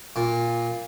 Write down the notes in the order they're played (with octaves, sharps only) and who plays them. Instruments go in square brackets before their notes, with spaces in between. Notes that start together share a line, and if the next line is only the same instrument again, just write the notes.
[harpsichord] A#2